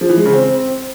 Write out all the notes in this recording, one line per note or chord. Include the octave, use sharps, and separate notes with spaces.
F3
E3
G#3
C#3
C4